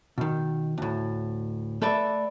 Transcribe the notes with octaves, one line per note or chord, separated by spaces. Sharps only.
B2 D#3
D2 A2
A3 A4 B4 D5 E5